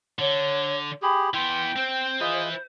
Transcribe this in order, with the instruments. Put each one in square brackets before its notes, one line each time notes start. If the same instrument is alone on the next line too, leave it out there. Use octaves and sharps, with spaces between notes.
[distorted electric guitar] D3 [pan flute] C#5
[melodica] G4 G#4 [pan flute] B5
[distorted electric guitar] E3 B3 [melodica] G5 [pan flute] C6
[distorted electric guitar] C4 [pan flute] C5
[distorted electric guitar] E4 B4 [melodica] F4 G#4 D#5